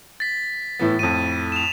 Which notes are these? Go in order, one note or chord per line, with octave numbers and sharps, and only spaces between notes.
A6 B6
A2 E3 B3
F2 A2 D#7
E7 F7